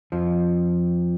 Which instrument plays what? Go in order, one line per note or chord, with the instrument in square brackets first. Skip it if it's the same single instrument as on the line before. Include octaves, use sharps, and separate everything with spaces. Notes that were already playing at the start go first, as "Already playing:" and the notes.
[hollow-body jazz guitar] F2 F3